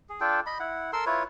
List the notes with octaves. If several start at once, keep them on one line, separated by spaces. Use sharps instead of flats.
G#4
D4 F4 A4 G5
D#5 B5
E4 F#5
A4 A#4 C6 E6
E4 F4 B4 C#5